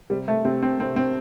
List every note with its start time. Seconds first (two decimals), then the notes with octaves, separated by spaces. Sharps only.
0.10 C3 G3
0.28 A3
0.45 C3 C4
0.63 C4
0.80 C2 C4
0.96 C4